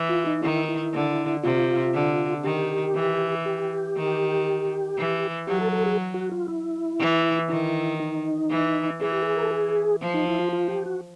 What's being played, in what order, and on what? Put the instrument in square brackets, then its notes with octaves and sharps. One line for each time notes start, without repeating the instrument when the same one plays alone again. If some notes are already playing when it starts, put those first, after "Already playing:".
Already playing: [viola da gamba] E3
[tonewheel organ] F4
D#4
[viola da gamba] D#3 [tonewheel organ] E4
[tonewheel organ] E4
[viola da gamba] D3
[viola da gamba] C3 [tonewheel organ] F4
[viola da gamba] D3
[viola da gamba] D#3 [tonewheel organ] G4
[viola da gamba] E3
[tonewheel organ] G4
[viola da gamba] D#3
E3
[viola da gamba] F#3 [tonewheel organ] G4
[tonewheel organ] A4
A4
G#4
F#4
F4
E4
[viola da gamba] E3
[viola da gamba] D#3 [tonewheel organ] E4
[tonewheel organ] D#4
[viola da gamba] E3
[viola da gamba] E3 [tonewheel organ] G#4
[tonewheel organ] G4
G#4
A#4
A4
G#4
[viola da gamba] F3
[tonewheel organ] D#4
E4
F4
F4
G4
F#4